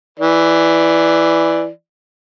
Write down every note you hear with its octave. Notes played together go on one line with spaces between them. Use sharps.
E3 D5